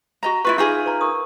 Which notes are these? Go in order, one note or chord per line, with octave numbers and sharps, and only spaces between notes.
F#4 D#5 A#5
E4 F4 B4 E5 B5 C#6
D#4 F4 G#4 F5 D6
B4 D5 A#5
A#4 C#6 D#6